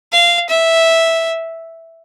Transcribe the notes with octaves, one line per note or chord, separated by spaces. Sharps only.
F5
E5